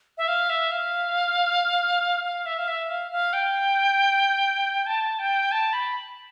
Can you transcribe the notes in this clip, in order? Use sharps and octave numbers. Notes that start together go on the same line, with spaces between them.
E5
F5
E5
F5
F5
E5
F5
E5
F5
F5
G5
A5
G5
A5
B5